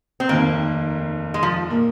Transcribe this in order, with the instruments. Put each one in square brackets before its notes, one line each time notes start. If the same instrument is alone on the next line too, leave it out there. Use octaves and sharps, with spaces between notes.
[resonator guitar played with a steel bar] C4
[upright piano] F1 D#2 D#3 [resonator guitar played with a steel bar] A#3
[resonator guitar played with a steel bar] G#3
F3
[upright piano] A#2 A#3